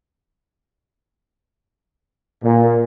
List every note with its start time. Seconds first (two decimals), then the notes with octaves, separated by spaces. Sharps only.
2.43 A#2